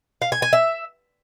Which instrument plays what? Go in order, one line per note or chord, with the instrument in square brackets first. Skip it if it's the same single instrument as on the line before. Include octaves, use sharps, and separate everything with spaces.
[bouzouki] F5
G#5
G#5
E5